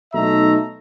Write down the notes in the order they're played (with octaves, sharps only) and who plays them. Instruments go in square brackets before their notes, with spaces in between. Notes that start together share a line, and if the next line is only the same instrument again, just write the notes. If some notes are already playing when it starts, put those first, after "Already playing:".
[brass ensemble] B1 A3 D#4 E5 A#5